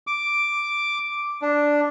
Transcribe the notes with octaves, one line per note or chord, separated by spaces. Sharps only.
D6
D4